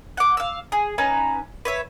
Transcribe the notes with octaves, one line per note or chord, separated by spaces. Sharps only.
F#5 D6
F5 E6
G#4
C#4 D#4 B4
B4 C#5 E5